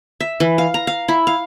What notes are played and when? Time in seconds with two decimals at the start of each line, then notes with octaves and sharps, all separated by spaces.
0.20 E5
0.40 E3
0.58 F5
0.74 A#5
0.87 F5
1.08 E4
1.27 F5